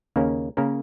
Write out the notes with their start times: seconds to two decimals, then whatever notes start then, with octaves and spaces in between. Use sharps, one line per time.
0.16 D#2 C#3 A#3 C#4 A#4
0.57 C#3 A#3 C#4 A#4